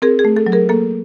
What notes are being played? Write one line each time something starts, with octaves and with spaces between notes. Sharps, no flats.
C4 G#4 A#4
G#4
A3
A4
F#3
G#4 A#4
A#3 A4